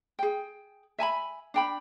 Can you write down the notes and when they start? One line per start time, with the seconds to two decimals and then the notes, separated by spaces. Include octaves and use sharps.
0.19 G#4 G5
0.98 E5 G#5 A5 B5
1.54 D4 G5 B5